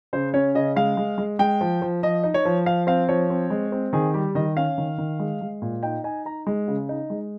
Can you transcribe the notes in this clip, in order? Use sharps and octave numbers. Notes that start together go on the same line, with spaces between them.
C#3 C5
C#4 C#5
C#3 D#5
G#3 F5
G#3
G#3
G#3 G5
F3
F3
F3 D#5
D#4
C#5
F3
F3 F5
C4 F5
F3 C#5
C4
G#3
C4
D#3 G#4
G3 G4
D#3 D#5
C#4 F5
D#3
D#3
G#3
G#3
A#2
D#4 G5
D#4 G#5
D#4 A#5
G#3
C#3
D#4
G#3